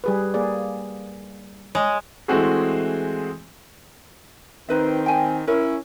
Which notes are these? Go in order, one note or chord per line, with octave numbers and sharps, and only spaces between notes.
G3 G#4 B4
A#3 G#4 D5
G#3 C#5
E3 G#3 A3 C4 F#4 G#4
D#3 C4 D#4 B4 E5
G5 G#5
C#4 E4 A#4